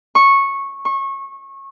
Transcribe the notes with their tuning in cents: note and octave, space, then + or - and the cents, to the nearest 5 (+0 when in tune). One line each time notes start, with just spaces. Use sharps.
C#6 -10
C#6 -25